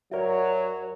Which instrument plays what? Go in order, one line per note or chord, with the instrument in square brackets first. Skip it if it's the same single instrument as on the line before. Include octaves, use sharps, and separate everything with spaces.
[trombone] F#3 [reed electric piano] F#4 A#4 [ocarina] C#5 [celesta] D5 E5